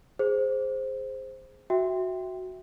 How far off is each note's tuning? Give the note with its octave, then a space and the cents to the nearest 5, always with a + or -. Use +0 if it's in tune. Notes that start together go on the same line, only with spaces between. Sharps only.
G#4 +0 C5 +0
F#4 -5 E5 +0 G5 +0